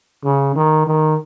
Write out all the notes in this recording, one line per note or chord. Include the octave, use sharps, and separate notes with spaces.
C#3
D#3
D#3